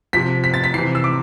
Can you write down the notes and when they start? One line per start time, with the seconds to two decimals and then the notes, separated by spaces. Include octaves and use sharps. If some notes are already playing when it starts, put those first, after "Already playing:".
0.13 C3 F3 B6
0.44 B6
0.54 A6
0.64 B6
0.74 C3 E3 C7
0.95 E6
1.04 D6